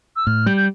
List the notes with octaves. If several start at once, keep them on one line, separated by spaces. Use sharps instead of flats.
E6
A2 F6
G3 G6
G6